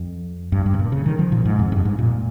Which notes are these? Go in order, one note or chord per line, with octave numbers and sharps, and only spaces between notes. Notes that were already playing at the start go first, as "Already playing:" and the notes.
Already playing: F2
G2
G2
C3
A#2
C#3
D#3
F3
A#2
G#2
F2
G2
G#2
A#2